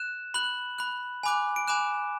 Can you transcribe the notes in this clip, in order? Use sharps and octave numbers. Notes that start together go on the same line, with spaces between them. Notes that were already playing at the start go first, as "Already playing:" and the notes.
Already playing: F#6 E7
B5 F#6 F#7
B5 F#6
G#5 B5 D6 F#6
D7
G#5 B5 D6 F#6 E7